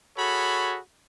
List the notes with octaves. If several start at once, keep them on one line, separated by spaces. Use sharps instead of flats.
F#4 G#4 A4 C#5 B5